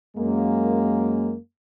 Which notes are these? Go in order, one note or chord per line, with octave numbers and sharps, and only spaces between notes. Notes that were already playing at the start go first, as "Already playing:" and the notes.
F#2 G#3 A#3